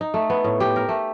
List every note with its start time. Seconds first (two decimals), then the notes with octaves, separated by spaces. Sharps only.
0.01 D#4
0.14 A3
0.30 B3
0.44 A2
0.60 G4
0.76 A#4
0.89 A3